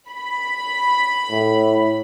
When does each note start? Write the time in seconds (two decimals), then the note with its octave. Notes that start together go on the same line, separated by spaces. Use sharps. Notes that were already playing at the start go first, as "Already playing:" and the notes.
0.10 B5
1.30 A2